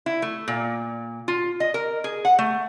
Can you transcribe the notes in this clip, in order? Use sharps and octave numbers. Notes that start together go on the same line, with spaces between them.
E4
A3
A#2
F4
D#5
A#4
G#4
F#5
A3